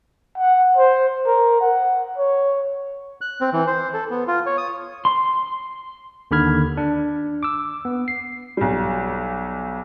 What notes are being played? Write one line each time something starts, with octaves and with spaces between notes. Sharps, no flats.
F#5
C5
A#4
F#5
C#5
F#6
C4
E3
C5
A4
B3
F4
C#5
D#6
C6
D#2 D3 D#3 B5 F6 G#6
D4
D6 E6
B3
C7
B1 G3